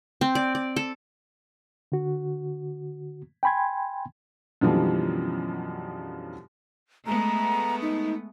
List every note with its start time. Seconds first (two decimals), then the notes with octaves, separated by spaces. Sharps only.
0.21 C4
0.35 D5
0.55 D5
0.76 A4
1.92 D3 F#4
3.43 G5 G#5 B5 C6 G#6
4.61 F#2 B2 D3 E3 F3 G3
7.06 G#3 A3 B3 A#5
7.82 D#4